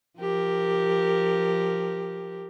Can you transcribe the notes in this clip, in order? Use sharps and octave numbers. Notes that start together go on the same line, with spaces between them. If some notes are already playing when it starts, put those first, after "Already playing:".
F3 G4 A#4